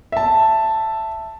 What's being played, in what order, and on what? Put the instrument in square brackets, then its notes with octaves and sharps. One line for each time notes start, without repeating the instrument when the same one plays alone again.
[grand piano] E5 A5